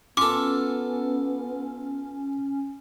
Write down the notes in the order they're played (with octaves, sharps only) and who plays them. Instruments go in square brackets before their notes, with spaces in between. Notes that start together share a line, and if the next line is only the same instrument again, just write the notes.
[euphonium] B3 [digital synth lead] C#4 [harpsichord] F4 A4 [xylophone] D6